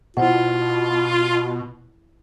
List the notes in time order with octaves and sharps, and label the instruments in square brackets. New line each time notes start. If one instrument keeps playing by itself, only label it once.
[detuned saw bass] B2 [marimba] E4 C5 F#5 [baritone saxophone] F4